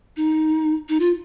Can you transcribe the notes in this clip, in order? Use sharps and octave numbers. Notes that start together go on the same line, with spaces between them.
D#4
D#4
F4